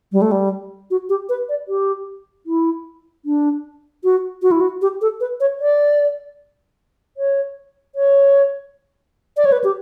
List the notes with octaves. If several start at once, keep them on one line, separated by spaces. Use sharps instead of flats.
G3
A3
G3
F#4
G4
B4
D5
G4
E4
D4
F#4
F#4
E4
F#4
G4
A4
B4
C#5
D5
C#5
C#5
D5
C#5
B4
G4